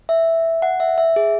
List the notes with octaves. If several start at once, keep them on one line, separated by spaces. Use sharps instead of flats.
E5
F#5
E5
E5
G#4